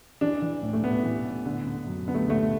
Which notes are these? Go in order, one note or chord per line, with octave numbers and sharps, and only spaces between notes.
E3 D4
E3
A2
A3
A2 B3
E3
A2
D3
D3
F#2
D3 B3
A3
D3 A3